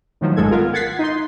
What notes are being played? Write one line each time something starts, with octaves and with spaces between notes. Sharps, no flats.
A2 D#3 F3 F#3
A1 G#2 G#3 A4 G#6
B3 F4 A#4
F#5 G#6 A6 B6 C7
D#4 C6